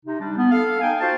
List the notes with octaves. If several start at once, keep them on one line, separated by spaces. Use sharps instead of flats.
C3 D#4
G3 D4
B3
A4 F5
D#4 F5 G5 G#5
F4 F#4 C5 A5